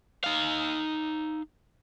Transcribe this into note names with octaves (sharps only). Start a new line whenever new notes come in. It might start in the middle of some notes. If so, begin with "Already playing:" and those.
D#4 F5